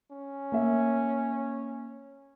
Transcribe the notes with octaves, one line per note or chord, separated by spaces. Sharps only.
C#4
A#3 E5